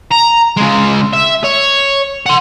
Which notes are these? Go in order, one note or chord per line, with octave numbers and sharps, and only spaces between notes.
A#5
C#3 G#3
E5
C#5
F#5 C6